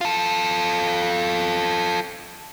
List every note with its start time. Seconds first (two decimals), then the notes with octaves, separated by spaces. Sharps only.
0.01 F4 A4